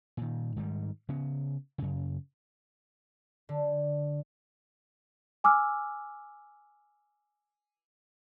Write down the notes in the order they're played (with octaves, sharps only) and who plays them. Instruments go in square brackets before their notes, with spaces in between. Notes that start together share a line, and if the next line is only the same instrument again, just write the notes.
[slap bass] A#2 D#3
G#2 D#3 G3
C#3 B3
F#2 C#3
[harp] D3
[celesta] G#5 D6 E6 F6